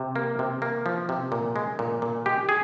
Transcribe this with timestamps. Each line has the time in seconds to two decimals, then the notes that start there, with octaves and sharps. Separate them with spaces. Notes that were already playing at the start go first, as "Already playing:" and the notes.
Already playing: C3
0.16 A#3
0.39 C3
0.62 A#3
0.86 F3
1.09 C3
1.32 A#2
1.56 G#3
1.79 A#2
2.02 A#2
2.26 G#3 G4
2.49 G#4